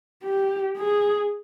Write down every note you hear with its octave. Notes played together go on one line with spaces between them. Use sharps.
G4
G#4